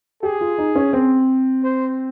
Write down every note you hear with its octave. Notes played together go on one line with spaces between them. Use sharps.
G4 G#4
F4
D#4
C#4
C4
C5